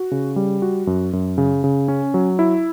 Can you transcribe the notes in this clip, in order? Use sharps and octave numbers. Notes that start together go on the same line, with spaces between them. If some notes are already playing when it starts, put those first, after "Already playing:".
Already playing: F#4
C#3
G3
F#4
F#2
F#2
C#3
C#3
C#4
F#3
E4